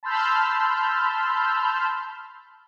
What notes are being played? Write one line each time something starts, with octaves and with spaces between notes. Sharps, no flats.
A5 B5 C6 E6 F6 G6